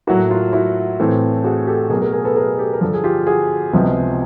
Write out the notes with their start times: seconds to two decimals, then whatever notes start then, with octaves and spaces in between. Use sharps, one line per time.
0.07 A2 F#3 A#3 E4 F#4
0.31 F4
0.53 E4 F#4
1.00 A2 E3 A3 C4
1.44 F#4 G#4
1.67 G4 A4
1.90 B2 F#3 A3 G#4 A#4
2.01 G#4 A#4
2.12 G#4 A#4
2.25 A4 B4
2.36 G#4 A#4
2.59 G4 A4
2.73 A#4
2.81 G2 D3 F3 A4
2.94 G#4
3.04 F4 G4
3.27 F#4 G#4
3.73 C#2 C3 F3 G#3 B3